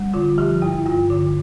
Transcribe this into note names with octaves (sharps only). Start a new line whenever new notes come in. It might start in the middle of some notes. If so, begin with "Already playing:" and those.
Already playing: G3
D3 F4
F3 G4
G2 E4
G2 F4
D3